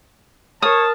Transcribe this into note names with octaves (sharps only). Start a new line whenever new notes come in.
A#4 C#5 A5 D#6 F6